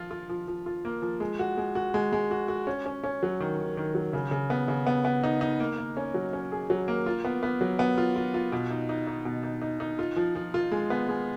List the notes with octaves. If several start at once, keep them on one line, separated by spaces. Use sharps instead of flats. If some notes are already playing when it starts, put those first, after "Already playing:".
Already playing: F3 F4
F4
F3
F3
F4
A#3
F3
G#3
F#4
G#3
F#4
G#3
G#3
F#4
F#4
C#4
C#4
C#4
F#3
D#3
D#3
D#3
F#3
C#3
C#3
B3
C#3
B3
B3
D#4
D#4
A#3
A#3
C#4
F#3
C#4
G#4
F#3
A#3
F4
B3
B3
F#3
B3
F4
F4
F4
B2
D#4
D#4
D#4
B2
D#4
D#4
D#4
F4
F3
F3
F4
G#3
B3
G#3